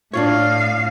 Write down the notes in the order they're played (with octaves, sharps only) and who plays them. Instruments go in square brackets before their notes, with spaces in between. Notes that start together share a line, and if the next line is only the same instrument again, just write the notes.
[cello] A2 F5 [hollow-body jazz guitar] D4 F4 C#5